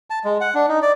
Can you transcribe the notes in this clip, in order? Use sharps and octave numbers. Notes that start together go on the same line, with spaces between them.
A5
G#3
F#5
D4
D#4
D5